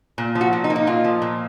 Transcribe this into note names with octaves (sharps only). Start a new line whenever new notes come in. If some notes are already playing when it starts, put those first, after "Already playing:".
A#2
F3
F#4
A#2
D#4
A#3
D#4
A#2 F4
F3
A#2